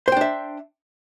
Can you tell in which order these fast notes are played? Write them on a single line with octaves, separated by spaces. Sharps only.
C5 G5 D4 E5